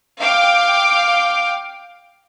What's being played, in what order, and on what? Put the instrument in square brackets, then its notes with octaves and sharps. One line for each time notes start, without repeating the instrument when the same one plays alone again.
[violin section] F5 G5 D6